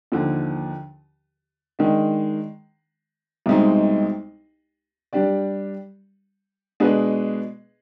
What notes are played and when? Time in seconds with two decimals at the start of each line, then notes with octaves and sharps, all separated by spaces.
0.12 D#2 D3 F3
1.79 D#3 G#3 D4
3.46 C2 B2 G#3 C4 D#4
5.13 G3 D4 G4 D5
6.80 B2 G#3 D4 G#4 B4